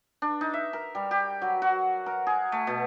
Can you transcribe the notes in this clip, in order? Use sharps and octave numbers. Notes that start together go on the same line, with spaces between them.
D4
D#4
E5
A#4
G3
G4
F#3
F#4
A#4
G#4
A3
B2